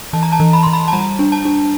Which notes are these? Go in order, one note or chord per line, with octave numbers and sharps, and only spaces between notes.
E3 A5
A#5
A5
E3
B5
E3 C6
B5
A5
G3 A#5
D4
A5
D4